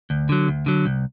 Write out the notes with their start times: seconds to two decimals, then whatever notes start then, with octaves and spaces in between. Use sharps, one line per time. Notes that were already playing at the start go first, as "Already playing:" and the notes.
0.10 D2
0.29 D3 F#3
0.48 D2
0.66 D3 F#3
0.86 C2